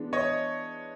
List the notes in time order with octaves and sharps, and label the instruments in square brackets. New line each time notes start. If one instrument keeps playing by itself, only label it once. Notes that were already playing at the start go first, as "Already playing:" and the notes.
Already playing: [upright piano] E3 G#3 B3 D4
[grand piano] C#5 D#5